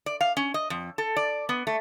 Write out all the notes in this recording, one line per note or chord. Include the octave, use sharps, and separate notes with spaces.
D5
F5
C#4
D#5
F2
A4
D5
B3
A3